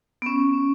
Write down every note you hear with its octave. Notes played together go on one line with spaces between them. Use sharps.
B3
C#4